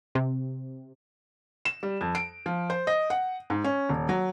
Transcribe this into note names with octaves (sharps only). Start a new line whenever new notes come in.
C3
E7
G3
F2
D7
F3
C5
D#5
F#5
G#2
C#4
D#1
F#3